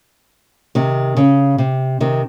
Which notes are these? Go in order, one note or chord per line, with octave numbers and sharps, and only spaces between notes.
C3 D#3
C#3
C3
C3 D#3